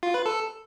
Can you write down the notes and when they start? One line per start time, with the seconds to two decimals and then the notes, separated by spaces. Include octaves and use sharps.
0.03 F4
0.14 B4
0.26 A4